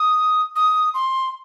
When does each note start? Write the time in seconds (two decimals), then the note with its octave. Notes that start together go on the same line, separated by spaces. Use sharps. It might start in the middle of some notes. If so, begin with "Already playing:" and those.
Already playing: D#6
0.56 D#6
0.94 C6